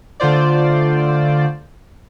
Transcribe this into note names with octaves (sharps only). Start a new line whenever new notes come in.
D3 A3 F4 C5 D5